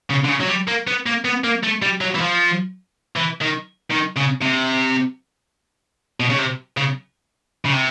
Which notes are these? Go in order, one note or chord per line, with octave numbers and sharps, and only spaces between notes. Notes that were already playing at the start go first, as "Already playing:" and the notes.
C#3
D3
C#3
F#3
G3
A#3
B3
A#3
B3
A#3
A3
G3
F#3
E3
F3
E3
D#3
D#3
C#3
C3
B2
C#3
C3
C#3
C#3
C3